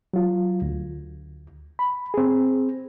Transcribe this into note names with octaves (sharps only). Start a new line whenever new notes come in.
F#3 F4
D2
B5
C4 G#4